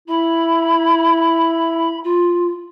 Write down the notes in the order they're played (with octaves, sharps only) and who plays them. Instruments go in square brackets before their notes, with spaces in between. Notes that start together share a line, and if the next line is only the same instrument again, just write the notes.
[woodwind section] E4 [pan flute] B5
[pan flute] F4